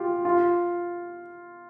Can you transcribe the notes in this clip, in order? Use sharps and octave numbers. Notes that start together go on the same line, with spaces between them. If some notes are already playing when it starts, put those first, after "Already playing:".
Already playing: F4 G4
F4